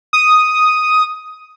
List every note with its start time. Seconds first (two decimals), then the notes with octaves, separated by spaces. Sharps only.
0.13 D#6